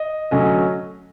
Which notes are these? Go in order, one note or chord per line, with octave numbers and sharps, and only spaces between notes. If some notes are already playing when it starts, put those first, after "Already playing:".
Already playing: D#5
D3 F#3 A3 C#4 D#5